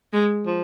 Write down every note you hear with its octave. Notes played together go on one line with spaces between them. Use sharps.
G#3
F3